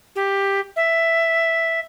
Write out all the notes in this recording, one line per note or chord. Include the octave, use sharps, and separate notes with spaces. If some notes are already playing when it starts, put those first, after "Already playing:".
G4
E5